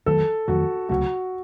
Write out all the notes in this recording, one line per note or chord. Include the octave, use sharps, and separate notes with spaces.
F2 D#3 F#3 A3 A4
F2 D#3 F#3 A3 F#4
C#2 C3 F#3 A3 F#4